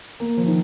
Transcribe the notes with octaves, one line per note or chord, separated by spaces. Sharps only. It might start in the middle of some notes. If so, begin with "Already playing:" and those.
A#3
F3
D#3